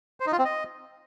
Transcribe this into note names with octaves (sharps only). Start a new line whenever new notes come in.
C5
D#4
F4
C4
D#5